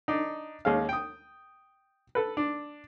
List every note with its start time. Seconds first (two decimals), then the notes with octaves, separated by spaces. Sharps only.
0.08 D4 D#4
0.65 D#2 G#3 C#4 F5
0.89 G5 D#6
2.15 A4 B4
2.37 D4